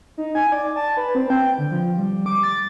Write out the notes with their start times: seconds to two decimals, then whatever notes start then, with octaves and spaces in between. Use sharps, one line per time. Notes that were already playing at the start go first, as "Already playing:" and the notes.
0.18 D#4
0.35 G#5
0.52 D5
0.76 A5
0.97 B4
1.15 C4
1.30 G5
1.58 D3
1.71 F3
1.98 G3
2.26 D6
2.43 A6